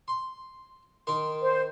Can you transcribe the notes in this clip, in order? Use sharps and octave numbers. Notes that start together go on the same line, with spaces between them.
C6
D#3 A#4 C6
C5